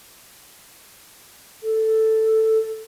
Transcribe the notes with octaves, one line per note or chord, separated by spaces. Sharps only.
A4